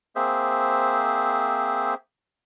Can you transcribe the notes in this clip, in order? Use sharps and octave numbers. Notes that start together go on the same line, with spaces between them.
A#3 C4 G#4 C5 E5